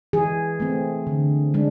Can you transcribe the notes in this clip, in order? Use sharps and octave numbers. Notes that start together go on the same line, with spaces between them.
E3 G#4
A3 C4
D3
G#3 D4